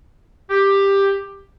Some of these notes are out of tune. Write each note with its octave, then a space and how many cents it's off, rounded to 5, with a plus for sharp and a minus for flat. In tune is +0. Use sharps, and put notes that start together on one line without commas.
G4 +10